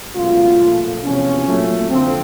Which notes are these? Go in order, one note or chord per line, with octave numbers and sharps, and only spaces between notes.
C#2 B2 F#3 A3 F4
A#2 F3 A3
E2 C3 F3 C#4
A#2 F#3 A3
F2 D3 F3 C4